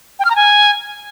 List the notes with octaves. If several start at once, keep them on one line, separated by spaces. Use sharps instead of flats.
G5
F6
A#5
G#5